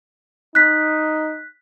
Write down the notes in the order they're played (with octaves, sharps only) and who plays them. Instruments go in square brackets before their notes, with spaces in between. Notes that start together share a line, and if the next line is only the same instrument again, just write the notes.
[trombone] D#4 [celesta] F#6 B6